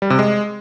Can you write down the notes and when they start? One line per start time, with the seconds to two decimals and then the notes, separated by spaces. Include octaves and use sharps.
0.02 G3
0.10 C3
0.19 G#3